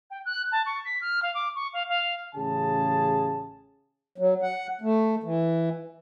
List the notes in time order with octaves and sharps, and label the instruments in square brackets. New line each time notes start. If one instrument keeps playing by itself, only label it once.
[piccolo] G5
F#6
A5
C#6
B6
F6
F5
D6
C#6
F5
F5
[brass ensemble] A1 C#3 G#4 A5
[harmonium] F#3
F#5
A3
E3